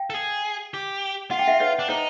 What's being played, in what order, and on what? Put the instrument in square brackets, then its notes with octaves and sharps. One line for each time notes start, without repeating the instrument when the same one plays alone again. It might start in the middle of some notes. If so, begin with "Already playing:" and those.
Already playing: [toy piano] F5 G5
[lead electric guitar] A4
G#4
G4
[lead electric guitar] F4 [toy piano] F#5
[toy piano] G5
E5 F#5
B4 C#5
[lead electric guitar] D4
[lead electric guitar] D#4 [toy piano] C5